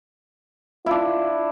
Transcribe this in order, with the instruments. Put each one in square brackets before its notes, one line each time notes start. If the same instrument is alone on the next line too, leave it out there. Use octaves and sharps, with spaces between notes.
[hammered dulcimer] D4 E4 [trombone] F4